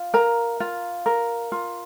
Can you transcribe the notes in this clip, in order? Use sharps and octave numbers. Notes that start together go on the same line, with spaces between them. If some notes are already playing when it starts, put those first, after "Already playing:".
Already playing: F4
A#4 A#5
F4
A#4
F4